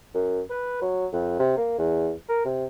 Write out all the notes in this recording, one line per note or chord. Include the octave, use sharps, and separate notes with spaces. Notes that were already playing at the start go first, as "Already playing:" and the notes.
F#2
B4
F#3
F2
C3
A#3
E2
A#4
C3